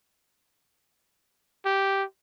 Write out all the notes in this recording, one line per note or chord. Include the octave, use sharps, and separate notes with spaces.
G4